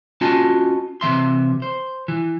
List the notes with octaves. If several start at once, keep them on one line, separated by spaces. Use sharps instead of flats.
C#4 F4 F#4 D#5 G#5 A5
C3 E3 E5 C6
C5
E3